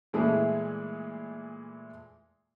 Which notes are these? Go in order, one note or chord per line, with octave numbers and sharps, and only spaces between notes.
A#2 E3 G#3 A3 E4 G#4